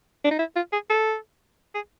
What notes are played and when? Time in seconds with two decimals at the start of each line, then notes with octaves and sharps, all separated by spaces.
0.24 D4
0.31 D#4
0.39 E4
0.56 F4
0.73 G#4
0.90 A4
1.75 G#4